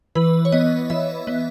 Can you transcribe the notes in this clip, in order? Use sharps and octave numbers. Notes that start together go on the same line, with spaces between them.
E3 B4
C#5
B3 D#5
E3 E5
B3